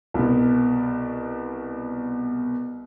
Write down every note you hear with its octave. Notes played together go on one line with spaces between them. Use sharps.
C2 B2